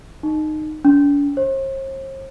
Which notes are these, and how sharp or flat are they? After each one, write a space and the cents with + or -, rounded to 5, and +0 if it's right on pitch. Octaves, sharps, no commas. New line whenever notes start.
D#4 -15
D4 -45
C5 +45